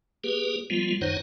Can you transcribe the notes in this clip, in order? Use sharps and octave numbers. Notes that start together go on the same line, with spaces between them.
A#3 G4 G#4 B4
F3 G3 G#3 B3 F4
F#2 D#3 D#4 C5 C#5 F#5